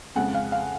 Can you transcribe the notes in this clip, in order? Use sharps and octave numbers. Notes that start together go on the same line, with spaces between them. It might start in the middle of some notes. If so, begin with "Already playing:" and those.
F2 C#3 G#3 F#5
F5
F5